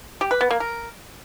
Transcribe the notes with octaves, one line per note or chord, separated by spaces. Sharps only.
G4
B4
B3
A#3
A#4